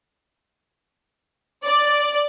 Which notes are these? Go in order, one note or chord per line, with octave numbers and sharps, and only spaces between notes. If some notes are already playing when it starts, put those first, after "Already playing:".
D5